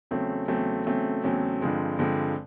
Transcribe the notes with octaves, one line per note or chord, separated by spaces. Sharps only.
E2 C#3 F#3 A3 C4
E2 C#3 F#3 A3 C4
E2 C#3 F#3 A3 C4
E2 C#3 F#3 A3 C4
G2 D3 F3 G#3 C4
G2 D3 F3 G#3 C4